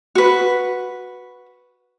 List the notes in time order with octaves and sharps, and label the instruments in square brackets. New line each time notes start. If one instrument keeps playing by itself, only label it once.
[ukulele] F#4 B4